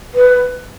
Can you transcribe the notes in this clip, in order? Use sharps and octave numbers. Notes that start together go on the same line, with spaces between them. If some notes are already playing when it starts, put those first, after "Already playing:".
B4